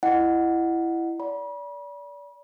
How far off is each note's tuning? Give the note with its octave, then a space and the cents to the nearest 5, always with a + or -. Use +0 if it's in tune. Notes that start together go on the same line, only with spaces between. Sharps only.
E4 +15 D#5 -20 F#5 +0
D5 -30 B5 -40